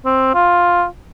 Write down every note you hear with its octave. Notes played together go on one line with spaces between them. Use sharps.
C4
F4